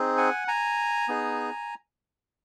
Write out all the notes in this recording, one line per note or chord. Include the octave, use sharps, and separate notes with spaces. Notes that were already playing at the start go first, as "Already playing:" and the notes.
Already playing: C4 D#4 G#4
F#5 G#5
G#5 A#5
B3 D#4 G#4